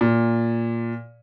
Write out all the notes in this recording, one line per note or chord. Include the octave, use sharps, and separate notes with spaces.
A#2